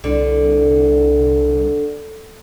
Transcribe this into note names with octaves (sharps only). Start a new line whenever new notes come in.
C2 D3